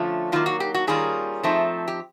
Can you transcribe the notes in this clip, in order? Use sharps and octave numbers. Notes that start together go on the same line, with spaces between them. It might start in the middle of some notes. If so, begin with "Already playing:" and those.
Already playing: D3 F3 A3 C#4 F4
D#3 F#3 A#3 F4
F#4
G4
F#4
D#3 G3 A#3 C#4 F4 G#4
F3 A3 C4 D#4
G4